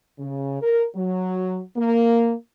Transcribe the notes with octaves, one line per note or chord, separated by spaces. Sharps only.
C#3
A#4
F#3
A#3